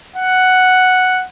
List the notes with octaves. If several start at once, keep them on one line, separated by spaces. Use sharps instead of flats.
F#5